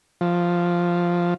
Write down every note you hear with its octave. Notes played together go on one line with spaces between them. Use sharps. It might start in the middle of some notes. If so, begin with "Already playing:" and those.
F3